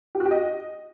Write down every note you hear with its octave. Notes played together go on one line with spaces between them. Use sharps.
G4
F#4
G4
D#5